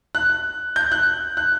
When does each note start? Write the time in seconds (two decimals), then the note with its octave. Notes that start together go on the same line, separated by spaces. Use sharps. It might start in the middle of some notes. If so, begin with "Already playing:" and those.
0.15 F#6
0.76 G6
0.92 F#6
1.37 F#6